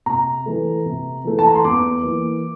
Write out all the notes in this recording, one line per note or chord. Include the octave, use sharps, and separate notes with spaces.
C3 A#5
E3 A3
C3
E3 A3
A5
A#5
C6
E2 D6
E3 A#3